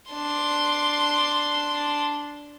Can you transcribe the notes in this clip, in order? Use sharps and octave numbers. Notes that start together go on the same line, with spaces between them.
D4 C6